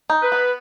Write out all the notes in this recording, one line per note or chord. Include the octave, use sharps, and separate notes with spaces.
D#4
B4
B3